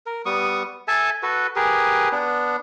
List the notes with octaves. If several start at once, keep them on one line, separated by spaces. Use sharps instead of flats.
A#4
G3 B3 C#6 D#6
A4 E5 G#5 A5
F#4 A4 B4
G4 G#4 A#4 B4
B3 D4